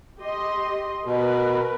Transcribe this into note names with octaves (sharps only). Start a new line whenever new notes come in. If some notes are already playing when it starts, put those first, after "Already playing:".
G4 D#5 C6
B2 A#4 B4